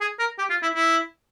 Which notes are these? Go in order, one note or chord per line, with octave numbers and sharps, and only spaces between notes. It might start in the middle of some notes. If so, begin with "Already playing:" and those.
G#4
A#4
G4
F4
E4
E4